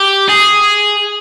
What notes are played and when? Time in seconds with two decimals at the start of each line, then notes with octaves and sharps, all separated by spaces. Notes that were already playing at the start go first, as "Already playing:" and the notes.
Already playing: G4
0.29 G#4